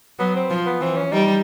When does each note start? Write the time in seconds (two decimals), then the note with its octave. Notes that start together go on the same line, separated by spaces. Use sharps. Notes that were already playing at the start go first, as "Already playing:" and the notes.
0.19 F#3 B3
0.36 C4
0.50 F3
0.66 B3
0.81 E3 C4
0.97 C#4
1.12 G3 D#4